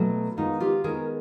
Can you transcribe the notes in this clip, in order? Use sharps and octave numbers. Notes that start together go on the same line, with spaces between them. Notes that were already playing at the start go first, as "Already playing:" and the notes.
Already playing: B2 F#3 A3 E4
D#3 G#3 B3 D#4 F4
F4 G4
D#3 G#3 B3 G#4 A#4